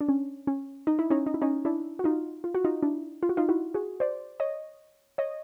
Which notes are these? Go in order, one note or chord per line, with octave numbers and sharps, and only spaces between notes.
D4
C#4
C#4
D#4
E4
C#4 D#4
D#4
E4
C#4 D#4
D4 E4
F#4
D#4 F4
F4
F#4
D#4 F4
D4 E4
F4
F#4
D#4 F4
E4 F#4
F#4 G#4
C5 D5
C#5 D#5
C#5 D#5